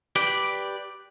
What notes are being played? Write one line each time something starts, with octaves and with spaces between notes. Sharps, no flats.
G4 B4 D5